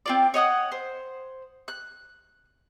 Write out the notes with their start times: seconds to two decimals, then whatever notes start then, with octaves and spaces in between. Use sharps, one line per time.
0.06 C4 F4 D5
0.34 C#5 D#5 F#5 D#6
0.72 C5
1.68 F#6